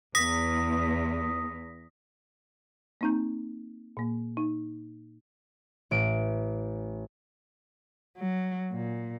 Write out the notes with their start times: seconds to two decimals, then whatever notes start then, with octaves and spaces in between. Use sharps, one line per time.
0.15 E2 D#6 A#6 B6
3.01 A#3 C4 D#4 A#5 G6
3.97 A#2 A#3
4.37 D#4
5.91 A1 D7
8.17 F#3
8.72 A#2